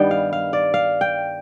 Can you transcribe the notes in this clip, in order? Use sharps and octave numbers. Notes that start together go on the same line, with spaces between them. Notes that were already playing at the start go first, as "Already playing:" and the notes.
Already playing: G2 D#3 G3 B3 G5
F5
F5
D5
F5
G5